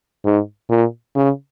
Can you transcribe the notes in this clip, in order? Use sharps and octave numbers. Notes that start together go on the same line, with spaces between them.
G#2
A#2
C#3